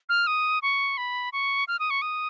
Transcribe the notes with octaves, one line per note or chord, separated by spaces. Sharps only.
F6
D#6
C#6
B5
C#6
F6
D#6
C#6
D#6